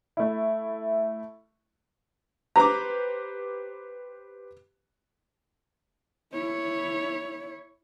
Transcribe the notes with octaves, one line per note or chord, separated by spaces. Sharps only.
A3 E4
G4 B4 C5 A#5 D6
E4 C#5